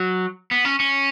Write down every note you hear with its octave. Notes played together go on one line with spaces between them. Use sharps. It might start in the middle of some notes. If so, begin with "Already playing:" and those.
Already playing: F#3
B3
C#4
C#4